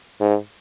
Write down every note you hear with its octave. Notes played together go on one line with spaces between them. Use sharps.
G#2